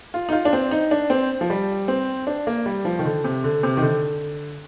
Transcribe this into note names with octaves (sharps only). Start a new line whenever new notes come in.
F4
D#4
F4
D4
C4
D#4
D4
C4
F3
G3
C4
D4
A#3
G3
F3
D#3
D3
C3
D3
C3
D#3
D3